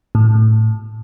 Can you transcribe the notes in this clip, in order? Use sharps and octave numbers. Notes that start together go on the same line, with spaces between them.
A2